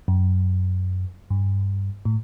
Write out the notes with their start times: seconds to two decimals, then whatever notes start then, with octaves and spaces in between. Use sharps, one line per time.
0.08 F#2
1.30 G2
2.05 A2